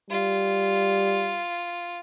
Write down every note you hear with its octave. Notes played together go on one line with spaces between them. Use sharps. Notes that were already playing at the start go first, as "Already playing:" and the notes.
G3 F4